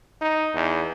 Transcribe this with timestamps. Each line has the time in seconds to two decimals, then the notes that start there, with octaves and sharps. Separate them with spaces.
0.21 D#4
0.54 E2